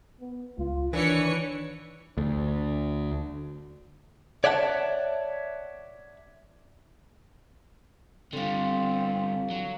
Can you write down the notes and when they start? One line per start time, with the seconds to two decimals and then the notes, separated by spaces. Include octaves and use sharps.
0.20 B3
0.58 C#2 F4
0.93 D#3 E3 D4 B4 C#5 C#7
2.17 D2
4.44 C#5 D5 E5 F#5 G5 A5
8.33 D3 G3 C4 A4 F5
9.50 F#3